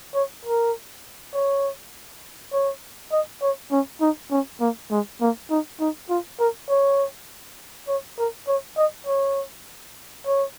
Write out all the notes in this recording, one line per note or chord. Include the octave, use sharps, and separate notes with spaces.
C#5
A#4
C#5
C#5
D#5
C#5
C#4
D#4
C#4
A#3
G#3
A#3
D#4
D#4
F4
A#4
C#5
C#5
A#4
C#5
D#5
C#5
C#5